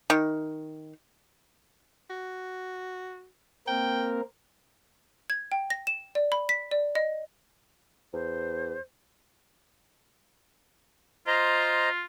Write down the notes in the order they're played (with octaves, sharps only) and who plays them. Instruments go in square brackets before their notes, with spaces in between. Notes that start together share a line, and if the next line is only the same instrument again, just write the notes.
[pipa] D#3
[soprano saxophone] F#4
[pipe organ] A#3 C4 A#4 [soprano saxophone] G5
[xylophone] G#6
G5
A#6
E7
D5
B5
B6
D5
D#5
[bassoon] E2 [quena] C5
[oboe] F4 [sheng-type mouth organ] C5 D#5 A#5